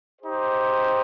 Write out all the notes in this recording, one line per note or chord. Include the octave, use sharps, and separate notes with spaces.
D#4 G4 C5